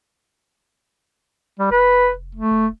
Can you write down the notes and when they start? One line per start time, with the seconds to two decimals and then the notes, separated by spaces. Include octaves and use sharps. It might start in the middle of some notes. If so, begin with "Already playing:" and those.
1.59 G3
1.71 F1 B4
2.35 A3
2.51 D#1